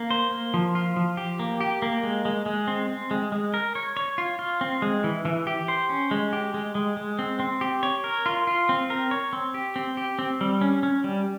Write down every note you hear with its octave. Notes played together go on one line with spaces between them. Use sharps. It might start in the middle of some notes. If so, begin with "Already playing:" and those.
Already playing: A#3
C5
A#3
F3
F4
F3
G4
A#3
G4
A#3
G#3
G#3
G#3
C4
C4
G#3
G#3
A#4
C#5
C#5
F4
F4
C4
G#3
E3
E3
G4
C5
C#4
G#3
G4
G#3
G#3
G#3
C4
C4
G4
C#5
A#4
F4
F4
C4
A#4
C#5
C4
G4
C4
G4
C4
G3
C#4
C#4
G3